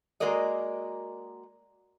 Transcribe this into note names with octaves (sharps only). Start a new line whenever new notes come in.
G#3 A#3 F#4 A#4 D5 D#5